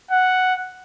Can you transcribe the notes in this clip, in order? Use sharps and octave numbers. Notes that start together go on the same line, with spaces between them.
F#5